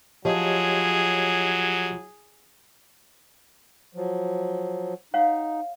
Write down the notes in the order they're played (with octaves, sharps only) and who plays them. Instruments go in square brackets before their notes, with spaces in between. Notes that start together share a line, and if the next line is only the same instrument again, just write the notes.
[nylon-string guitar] F3 [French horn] F#3 [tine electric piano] G4 C#5 D#5 [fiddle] G#4
[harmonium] F3 F#3
[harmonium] D#4 [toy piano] C#5 F5 F#5